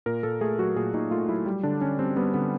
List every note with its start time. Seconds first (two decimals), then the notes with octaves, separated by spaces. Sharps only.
0.06 A#2 A#4
0.23 A#2 A4
0.41 A3 G#4
0.59 F#3 F#4
0.76 A#2 G#4
0.94 A#2 D#4
1.11 A3 F4
1.29 F#3 E4
1.46 G3
1.63 D3 D4
1.81 D3 C#4
1.99 G3 C4
2.16 G3 B3
2.34 D3 B3